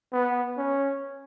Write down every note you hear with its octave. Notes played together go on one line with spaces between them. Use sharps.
B3
C#4